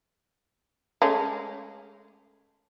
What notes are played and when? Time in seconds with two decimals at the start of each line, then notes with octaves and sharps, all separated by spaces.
1.02 G#3 A3 C#4